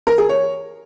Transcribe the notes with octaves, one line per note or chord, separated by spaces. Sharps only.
A#4
G#4
C#5